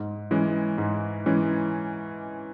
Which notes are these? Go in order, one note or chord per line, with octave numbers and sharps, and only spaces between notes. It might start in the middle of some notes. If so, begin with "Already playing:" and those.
Already playing: G#2
E3 G#3 C#4
G#2
E3 G#3 C#4